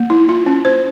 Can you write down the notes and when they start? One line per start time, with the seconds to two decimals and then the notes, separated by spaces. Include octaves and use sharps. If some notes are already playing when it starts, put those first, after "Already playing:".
Already playing: A#3
0.10 E4
0.29 F4
0.46 C#4
0.65 C5